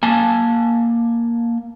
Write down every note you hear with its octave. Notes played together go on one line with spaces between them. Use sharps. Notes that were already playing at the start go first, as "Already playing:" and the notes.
A#3 G#5 A5